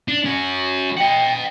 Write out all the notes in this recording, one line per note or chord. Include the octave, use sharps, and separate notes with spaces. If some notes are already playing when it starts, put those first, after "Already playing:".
D4
C#4 F#4
D#5 F#5 G5